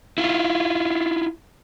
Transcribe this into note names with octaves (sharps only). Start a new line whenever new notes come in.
E4 F4